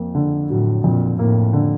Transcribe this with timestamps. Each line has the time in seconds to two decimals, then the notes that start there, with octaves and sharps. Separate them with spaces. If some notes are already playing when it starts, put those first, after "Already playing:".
Already playing: F2 A#3
0.15 D3
0.50 A2 F#3
0.84 F2 A#2
1.19 A2 A#3
1.53 D3